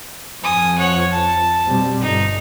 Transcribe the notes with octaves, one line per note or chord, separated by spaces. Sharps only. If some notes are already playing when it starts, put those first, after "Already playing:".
F2 F3 G#5 D#6
C#5 F#5
A5
B2 G3 C4
G1 D#4